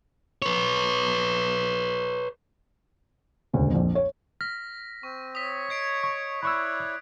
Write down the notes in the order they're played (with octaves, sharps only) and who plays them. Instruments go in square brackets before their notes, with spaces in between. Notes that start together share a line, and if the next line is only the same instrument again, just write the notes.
[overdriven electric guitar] B4 C#5
[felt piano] E1 D2 C#3
A#1 F2
C#5
[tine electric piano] F6 [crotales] A#6 B6
[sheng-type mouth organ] C4 [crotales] C#6
[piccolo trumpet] C#5 [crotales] D#6 B6
[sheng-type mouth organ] D#5 [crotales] G#6 C7 D7
[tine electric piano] C#6
[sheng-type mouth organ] E4 C#5 D5 [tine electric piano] B5 C#6 E6 [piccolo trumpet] F#6